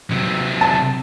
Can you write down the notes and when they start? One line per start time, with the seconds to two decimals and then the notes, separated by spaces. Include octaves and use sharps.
0.11 C3 F#3
0.61 A5